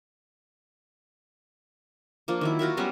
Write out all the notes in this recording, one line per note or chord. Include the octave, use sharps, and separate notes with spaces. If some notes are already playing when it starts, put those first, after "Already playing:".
F3 A#3 D4
D#3 F#3 E4
F4 F#4 A#4 E5
F#3 G3 B3 C#4